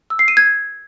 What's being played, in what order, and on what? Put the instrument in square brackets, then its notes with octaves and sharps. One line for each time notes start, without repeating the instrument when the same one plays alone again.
[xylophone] E6
C7
D#7
G#6